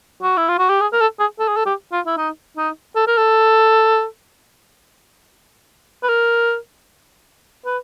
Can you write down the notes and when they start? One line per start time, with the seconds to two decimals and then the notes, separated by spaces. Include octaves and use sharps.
0.23 F#4
0.37 E4
0.49 F4
0.59 F#4
0.69 G4
0.81 G#4
0.93 A#4
1.01 A4
1.20 G#4
1.39 A4
1.48 G#4
1.56 A4
1.66 G4
1.92 F4
2.06 E4
2.17 D#4
2.57 D#4
2.96 A4
3.07 A#4
3.17 A4
6.03 B4
6.09 A#4
7.66 B4